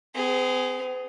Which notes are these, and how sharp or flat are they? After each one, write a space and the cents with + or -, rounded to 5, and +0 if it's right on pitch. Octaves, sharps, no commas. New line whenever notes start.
C4 -45 G#4 +0